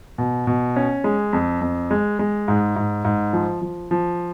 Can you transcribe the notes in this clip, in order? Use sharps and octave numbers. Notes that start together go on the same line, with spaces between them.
B2
B2
C#4
G#3
F2
F2
G#3
G#3
G#2
G#2
G#2
F3
F3
F3